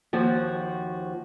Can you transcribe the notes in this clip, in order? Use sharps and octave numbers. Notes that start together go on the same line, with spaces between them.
D#2 F3 F#4